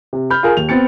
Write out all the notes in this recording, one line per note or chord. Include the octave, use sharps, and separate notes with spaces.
C3
B5 F6 G6
F4 G#4 A#4
D#2 F7
B3 C4 A6 C#7